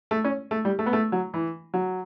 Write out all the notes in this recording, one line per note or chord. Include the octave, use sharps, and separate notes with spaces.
A3
C#4
A3
G3
A3
B3
A3
F#3
E3
F#3